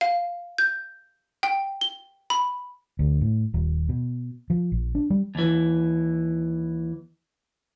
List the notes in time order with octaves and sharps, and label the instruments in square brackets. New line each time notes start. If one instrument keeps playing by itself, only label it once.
[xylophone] F5
G6
G5
G7
B5
[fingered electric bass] D2
A2
D#1
B2
F3
A#1
D4
G3
[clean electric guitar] D#2 E3